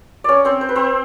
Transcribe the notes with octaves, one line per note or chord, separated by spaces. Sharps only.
C#4 C#5 D5
C4 C5
C5
B4
C4 C5